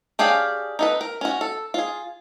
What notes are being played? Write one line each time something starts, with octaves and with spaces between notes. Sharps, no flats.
D4 G4 G#4 C#5 F5
D#4 A4 B4
A#4
C#4 F#4
A4
F4 G#4